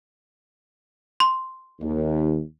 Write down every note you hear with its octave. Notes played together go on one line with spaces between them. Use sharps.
C6
D#2